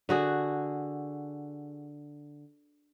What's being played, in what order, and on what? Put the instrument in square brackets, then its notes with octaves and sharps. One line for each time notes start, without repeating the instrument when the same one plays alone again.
[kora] D3 F#4 G#4